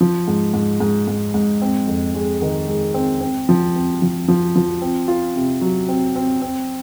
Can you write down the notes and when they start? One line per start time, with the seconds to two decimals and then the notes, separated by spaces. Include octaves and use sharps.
0.01 F3
0.28 G#2
0.54 G#2
0.80 G#2
1.08 G#2
1.34 G#2
1.62 C4
1.87 F2
2.15 G#3
2.42 D#3
2.68 G#3
2.94 C4
3.21 C4
3.49 F3
3.75 C4
4.02 F3
4.28 F3
4.56 F3
4.82 C4
5.08 F4
5.36 C3
5.61 F#3
5.89 C4
6.16 C4
6.42 C4